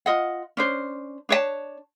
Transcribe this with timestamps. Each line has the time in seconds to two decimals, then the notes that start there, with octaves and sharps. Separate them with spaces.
0.06 F4 D#5 F#5
0.57 C#4 D4 C5
1.29 D4 C#5 D5 A5